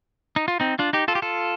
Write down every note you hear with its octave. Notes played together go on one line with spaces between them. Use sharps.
D#4
F4
C4 D#4
D4 F4
D#4 G4
F4 A4
G4
F4 A4